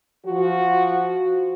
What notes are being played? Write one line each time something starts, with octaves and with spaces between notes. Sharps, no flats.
F3 F#4